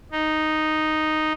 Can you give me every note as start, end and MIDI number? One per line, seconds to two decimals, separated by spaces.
0.12 1.32 63